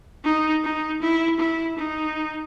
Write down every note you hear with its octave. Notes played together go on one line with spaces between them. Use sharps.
D#4
D#4
E4
E4
D#4